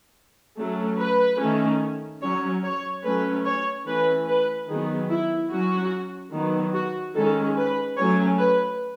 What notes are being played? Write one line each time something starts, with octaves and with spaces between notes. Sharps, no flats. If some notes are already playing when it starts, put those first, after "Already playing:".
F#3 A3 C#4
B4
D#3 A3 C#4
F#3 C#4 C#5
C#5
F#3 A3 C#4 B4
C#5
E3 A3 C#4 B4
B4
D#3 F#3 B3 G#4
E4
F#3 C#4 F#4
D#3 F#3 B3
F#4
D#3 G#3 C#4 A4
B4
F#3 A3 C#4 C#5
B4